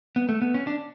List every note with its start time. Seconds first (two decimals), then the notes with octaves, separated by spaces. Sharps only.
0.16 B3
0.29 A3
0.42 B3
0.54 C#4
0.67 D4